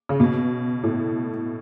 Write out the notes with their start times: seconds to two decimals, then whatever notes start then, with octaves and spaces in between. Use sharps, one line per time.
0.09 C#3
0.20 B2
0.83 A2